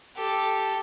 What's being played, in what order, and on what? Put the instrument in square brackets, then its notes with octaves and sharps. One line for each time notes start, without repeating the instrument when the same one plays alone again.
[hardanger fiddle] G4 A4